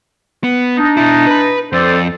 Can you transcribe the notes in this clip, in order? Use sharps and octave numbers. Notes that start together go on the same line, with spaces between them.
B3
D4 D#4
B2 E4
B4 B5
F2 A4 C5 D5